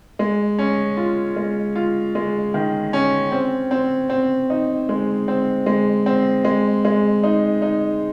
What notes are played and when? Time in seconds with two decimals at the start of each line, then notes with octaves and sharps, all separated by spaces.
0.19 G#3
0.59 C#4
0.97 F4
1.36 G#3
1.76 F4
2.15 G#3
2.54 D#3
2.93 C#4
3.32 C4
3.71 C4
4.10 C4
4.50 D#4
4.89 G#3
5.28 C4
5.66 G#3
6.06 C4
6.44 G#3
6.85 G#3
7.23 D#4
7.62 D#4